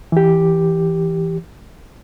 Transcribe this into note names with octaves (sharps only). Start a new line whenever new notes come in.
E3 G4